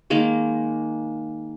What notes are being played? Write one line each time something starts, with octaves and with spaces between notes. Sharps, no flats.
D#3 G#3 A#3